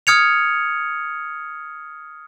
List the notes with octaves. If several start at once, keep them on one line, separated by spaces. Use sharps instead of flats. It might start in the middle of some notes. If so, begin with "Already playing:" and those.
D#6 F6 G#6 C#7 F7